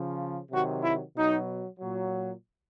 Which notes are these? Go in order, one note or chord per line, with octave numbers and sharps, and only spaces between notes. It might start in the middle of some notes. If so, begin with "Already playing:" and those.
Already playing: C#3 F3
C3 D#3 F#3 F#4
E4
B2 F#3 D#4
A#2 F#3